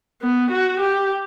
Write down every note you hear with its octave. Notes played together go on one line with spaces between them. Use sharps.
B3
F#4
G4